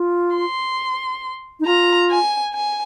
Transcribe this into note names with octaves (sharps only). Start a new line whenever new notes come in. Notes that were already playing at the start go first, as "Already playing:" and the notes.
Already playing: F4
C6
D#4
F4 A#5
G#5
G#5